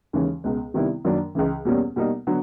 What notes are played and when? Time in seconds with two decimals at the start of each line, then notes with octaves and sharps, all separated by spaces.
0.13 D#2 C#3 E3 G#3 C#4
0.44 C#2 B2 G#3
0.74 C3 D#3 G3 B3 E4
1.05 F#2 D#3 F#3 A#3 D4
1.35 C#2 C#3 E3
1.65 E2 B2 G3 A#3 C#4
1.96 B2 G3 A#3 D#4
2.27 D3 F#3 B3